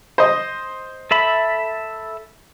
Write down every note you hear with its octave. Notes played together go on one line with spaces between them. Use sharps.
C5 D#5
A4 E5 B5